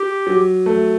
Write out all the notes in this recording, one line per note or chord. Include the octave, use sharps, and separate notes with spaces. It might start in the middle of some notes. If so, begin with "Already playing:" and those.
Already playing: G4
F#3
A3